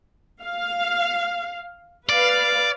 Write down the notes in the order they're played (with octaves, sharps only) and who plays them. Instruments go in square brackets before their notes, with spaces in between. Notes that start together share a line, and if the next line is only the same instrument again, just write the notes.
[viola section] F5
[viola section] B4 F5 [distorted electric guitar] D5